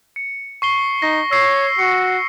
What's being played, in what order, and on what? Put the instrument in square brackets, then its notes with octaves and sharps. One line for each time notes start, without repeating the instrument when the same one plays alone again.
[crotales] C#7
C#6 C7 G7
[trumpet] D#4 [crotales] A#6
[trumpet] C#5 [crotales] E6 C7
[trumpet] F#4 [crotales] C#7